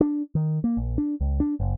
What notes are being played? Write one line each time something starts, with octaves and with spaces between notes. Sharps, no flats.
D4
D#3
A#3
A#1
D4
C#2
D4
F#1